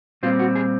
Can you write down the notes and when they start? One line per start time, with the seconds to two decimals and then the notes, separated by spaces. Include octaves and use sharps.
0.23 A#2 G3 C4 F4
0.39 F#4
0.56 G#4